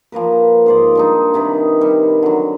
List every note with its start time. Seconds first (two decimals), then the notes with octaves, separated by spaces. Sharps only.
0.12 F3 A#3 A#4 B4
0.66 G#2 C5 D5
0.95 G3 D4 D#4
1.34 C3 D#3 B4
1.81 G3
2.23 D3 F#3